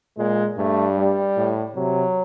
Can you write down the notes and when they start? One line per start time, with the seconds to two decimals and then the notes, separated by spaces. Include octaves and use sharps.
0.17 A#2 G#3
0.57 G2 A3
0.97 G3
1.37 A2
1.76 C3 F#3